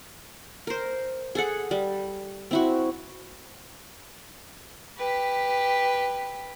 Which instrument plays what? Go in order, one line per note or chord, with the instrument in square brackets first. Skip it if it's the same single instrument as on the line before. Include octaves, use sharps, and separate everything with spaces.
[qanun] A#4 C5
G#4 A4 F#5
G3
C4 E4 F#4
[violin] G4 B4